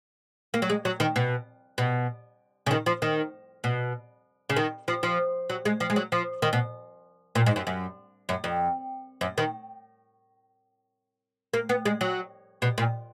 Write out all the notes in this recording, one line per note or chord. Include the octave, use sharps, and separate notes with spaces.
A#3
F#3
G#3
F#3
D#3
B2
B2
C#3
D#3
F3
D#3
B2
C#3
D#3
F3
F3
F#3
G#3
F3
G#3
F#3
F3
D#3
B2
A#2
G#2
F#2
F#2
F#2
F2
F#2
D#3
A#3
B3
G#3
F#3
B2
A#2